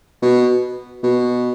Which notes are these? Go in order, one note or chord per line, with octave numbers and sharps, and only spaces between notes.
B2
B2